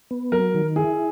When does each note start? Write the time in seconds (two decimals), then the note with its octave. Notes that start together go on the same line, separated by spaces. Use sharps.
0.11 B3
0.32 F#3 A#4
0.54 D#3
0.76 E4 G#4